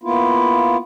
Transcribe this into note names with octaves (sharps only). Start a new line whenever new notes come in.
A#3 B3 E4 F4